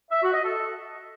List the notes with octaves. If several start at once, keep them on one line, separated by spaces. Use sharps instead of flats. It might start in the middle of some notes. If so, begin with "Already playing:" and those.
E5
F#4
D#5
A4